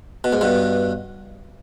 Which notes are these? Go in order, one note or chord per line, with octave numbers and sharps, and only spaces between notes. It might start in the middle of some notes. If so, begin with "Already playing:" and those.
B2
G#2
G2 B2